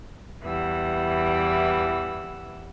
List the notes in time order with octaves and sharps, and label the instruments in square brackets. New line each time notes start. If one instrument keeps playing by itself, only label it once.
[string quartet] E2 E3 G3 F#5 E6